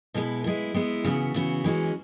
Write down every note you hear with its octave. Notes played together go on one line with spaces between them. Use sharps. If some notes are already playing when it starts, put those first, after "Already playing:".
B2 G#3 B3 E4 B4
G#3 B3 E4
G#3 B3 E4
C#3 E3 B3 F#4
C#3 E3 B3 F#4
E3 G#3 C#4 F#4